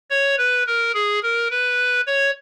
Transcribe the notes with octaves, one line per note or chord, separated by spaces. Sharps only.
C#5
B4
A#4
G#4
A#4
B4
C#5